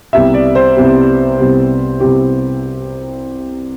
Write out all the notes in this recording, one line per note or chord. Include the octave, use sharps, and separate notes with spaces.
C2 C3 G3 B3 E5
D5
C5
C2 C3 G3 B3
C2 C3 G3 B3
C2 C3 G3 B3 G4